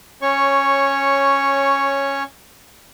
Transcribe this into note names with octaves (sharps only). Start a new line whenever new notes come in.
C#4 C#5 C#6